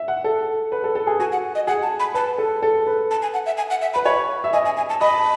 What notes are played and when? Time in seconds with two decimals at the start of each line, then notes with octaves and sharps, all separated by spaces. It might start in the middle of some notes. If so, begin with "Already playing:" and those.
Already playing: E5
0.08 F#5
0.24 A4
0.72 B4
0.84 A4
0.95 A4
1.07 G#4
1.19 F#4 G#5
1.32 F#5
1.55 D#5
1.67 G#4 F#5
1.83 A5
2.00 B5
2.14 B4 A5
2.38 A4
2.63 A4
2.87 B4
3.11 A5
3.22 G#5
3.34 F#5
3.46 E5
3.57 G#5
3.70 F#5
3.82 E5
3.94 B4 B5
4.05 C#5 B5
4.44 E5
4.53 D#5 G#5
4.66 G#5
4.77 G#5
4.89 A5
5.01 D#5 B5
5.14 A5